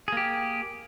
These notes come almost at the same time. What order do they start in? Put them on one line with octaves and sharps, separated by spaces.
G#4 A#3 G4